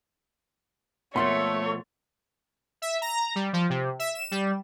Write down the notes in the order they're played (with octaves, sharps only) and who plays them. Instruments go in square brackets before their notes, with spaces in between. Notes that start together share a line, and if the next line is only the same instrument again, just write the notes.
[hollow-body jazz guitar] B2 F3 A#3 [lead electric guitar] A3 [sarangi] C#5 [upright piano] C6 A6
[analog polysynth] E5
A#5
G3
F3
C3
E5
E7
G3